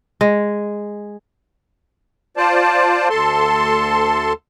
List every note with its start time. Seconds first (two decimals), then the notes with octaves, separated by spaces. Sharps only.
0.21 G#3
2.37 F4 C5 D5 A5
3.10 D2 A4 A5 C6